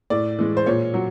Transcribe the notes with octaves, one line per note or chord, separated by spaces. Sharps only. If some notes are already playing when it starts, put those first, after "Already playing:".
A2 D5
E3 G#3
C5
A#2 C#5
F#3